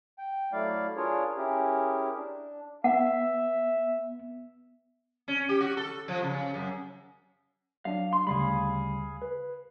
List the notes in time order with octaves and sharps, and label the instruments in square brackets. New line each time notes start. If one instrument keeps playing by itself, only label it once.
[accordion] G5
F#3 A3 E4 D5 F5
D4 F4 G#4 A#4 C#5
C#4 E4 G4 G#4 A#4
D4
[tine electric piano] B3 [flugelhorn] E5 [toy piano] F#5
[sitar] C#4
G4
F#4
A4
F3
C#3
F#2
[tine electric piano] F#3 D4 [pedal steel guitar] F5
[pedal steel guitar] C6
[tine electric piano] D2 C#3 G3 [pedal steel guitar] G#4 F5 B5
[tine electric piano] B4